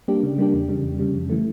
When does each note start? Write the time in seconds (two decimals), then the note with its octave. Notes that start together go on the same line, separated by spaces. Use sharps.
0.08 G3 A#3 D4 G4
0.23 C#3
0.38 G3 A#3 D4 G4
0.54 E2
0.69 C#3 G3
0.84 E2
0.99 C#3 G3
1.15 F2
1.30 E3 A3